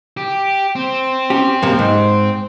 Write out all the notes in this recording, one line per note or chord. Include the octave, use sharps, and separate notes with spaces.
G4
C4
C#4 G4
F#2 C3 A#3
G#2